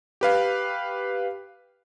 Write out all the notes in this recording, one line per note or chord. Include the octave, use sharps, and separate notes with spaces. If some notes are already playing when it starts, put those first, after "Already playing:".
G4 B4 F5